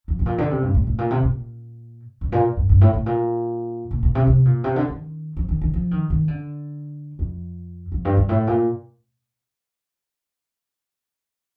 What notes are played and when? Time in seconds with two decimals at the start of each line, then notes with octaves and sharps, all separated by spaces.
0.08 F2
0.19 A2
0.26 A#2
0.38 D3
0.51 C3
0.62 G2
0.74 A2
0.87 A2
0.98 A#2
1.11 C3
1.23 A#2
2.21 G2
2.32 A#2
2.57 G2
2.69 G2
2.81 A2
2.94 A2
3.06 A#2
3.91 A#2
4.03 A#2
4.15 C3
4.27 C3
4.45 A#2
4.64 C3
4.76 D3
4.88 D#3
5.37 F3
5.49 D#3
5.61 D#3
5.74 F3
5.91 D#3
6.10 D#3
6.28 D3
7.19 F2
7.92 F2
8.05 G2
8.17 G2
8.29 A2
8.47 A#2